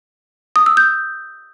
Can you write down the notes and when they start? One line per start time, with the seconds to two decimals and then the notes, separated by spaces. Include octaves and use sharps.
0.56 D#6
0.66 E6
0.77 G6